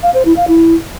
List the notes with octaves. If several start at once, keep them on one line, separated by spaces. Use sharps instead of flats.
F5
C5
E4
F5
E4